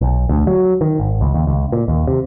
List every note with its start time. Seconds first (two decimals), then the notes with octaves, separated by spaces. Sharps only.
0.01 B1
0.29 D2
0.47 F#3
0.81 D#3
1.00 G#1
1.21 C#2
1.34 D#2
1.47 C#2
1.72 A#2
1.88 D#2
2.07 C3